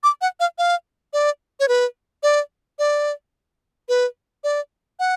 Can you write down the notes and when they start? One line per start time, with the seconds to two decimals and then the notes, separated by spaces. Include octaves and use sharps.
0.03 D6
0.21 F#5
0.40 F5
0.58 F5
1.13 D5
1.60 C#5
1.68 B4
2.23 D5
2.79 D5
3.89 B4
4.44 D5
4.99 F#5